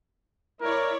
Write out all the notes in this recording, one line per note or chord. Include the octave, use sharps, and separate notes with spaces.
E4 A#4 C#5 D5